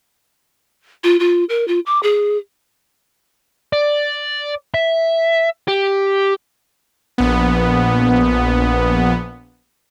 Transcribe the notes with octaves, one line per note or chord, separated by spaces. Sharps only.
F4
F4
A#4
F4
D6
G#4
D5
E5
G4
A#1 B3